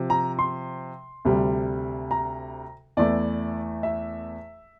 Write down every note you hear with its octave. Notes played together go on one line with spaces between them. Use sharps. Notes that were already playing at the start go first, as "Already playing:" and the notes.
Already playing: C3 F3
A#5
C6
D2 C3 G3
A#5
E2 E3 A3 E4 D5
E5